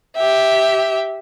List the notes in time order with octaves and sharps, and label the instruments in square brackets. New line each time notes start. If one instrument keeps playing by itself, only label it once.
[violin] G4 E5